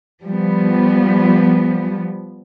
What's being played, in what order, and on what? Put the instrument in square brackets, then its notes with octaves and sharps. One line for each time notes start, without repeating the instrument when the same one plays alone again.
[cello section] F3 G3 B3